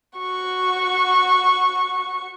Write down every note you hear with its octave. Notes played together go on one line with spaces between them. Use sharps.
F#4 C#6